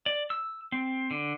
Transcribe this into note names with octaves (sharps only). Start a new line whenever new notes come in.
D5
E6
C4
D3